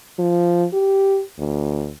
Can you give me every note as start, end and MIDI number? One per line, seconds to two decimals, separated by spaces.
0.19 0.66 53
0.73 1.21 67
1.38 1.92 38